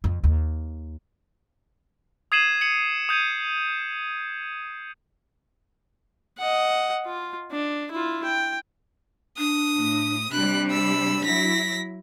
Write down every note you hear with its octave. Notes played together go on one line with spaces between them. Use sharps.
F2
D#2
D#6 G#6 C7 D#7 E7 F#7
C#7 F#7
D#6 G6 G#6 D#7
D#5 F#5
F4
D4
E4 F4
G5
D4 D#6
A2
C3 G3 D4 B5 F#6
B5 E6
F#3 E4 A#6 B6